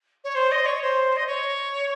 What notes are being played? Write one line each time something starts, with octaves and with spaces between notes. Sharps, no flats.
C#5
C5
D#5
C#5
C5
D#5
C#5